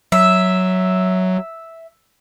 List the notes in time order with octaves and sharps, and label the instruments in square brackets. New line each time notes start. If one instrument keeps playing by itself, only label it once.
[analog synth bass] F#3 [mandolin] E5